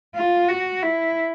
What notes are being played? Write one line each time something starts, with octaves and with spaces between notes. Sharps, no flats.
F4
F#4
E4